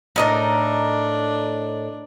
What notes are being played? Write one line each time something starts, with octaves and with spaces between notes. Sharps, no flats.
A2 D4 D#4 A#4